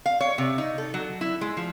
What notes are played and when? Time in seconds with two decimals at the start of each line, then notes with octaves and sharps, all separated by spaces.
0.06 F5
0.20 C#5
0.38 C3
0.58 D#4
0.78 A4
0.94 F#3
1.21 E4
1.41 G#3
1.57 F3